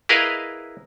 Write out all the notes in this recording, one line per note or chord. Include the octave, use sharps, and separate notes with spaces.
E4 G#4 A#4 B4 D#5 F5